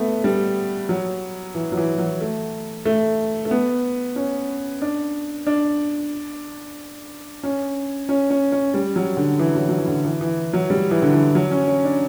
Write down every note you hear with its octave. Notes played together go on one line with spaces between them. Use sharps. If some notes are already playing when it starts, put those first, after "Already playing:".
Already playing: A3 B3
G3
F#3
E3
F#3
E3
F#3
A3
A3
A3
B3
C#4
D4
D4
C#4
C#4
C#4
C#4
G3
F#3
D3
E3
F#3
F#3
E3
D3
E3
E3
F#3
G3
E3
D3
E3
F#3
C#4
C#4
D4